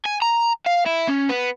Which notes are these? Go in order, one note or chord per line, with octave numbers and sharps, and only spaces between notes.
G#5
A#5
F5
E4
C#4
B3